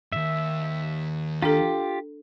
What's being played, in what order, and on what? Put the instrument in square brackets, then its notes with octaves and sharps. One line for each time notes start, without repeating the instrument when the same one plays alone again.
[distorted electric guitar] D#2 G#2 [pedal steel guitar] E5
[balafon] D4 A4 [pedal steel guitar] F4 G4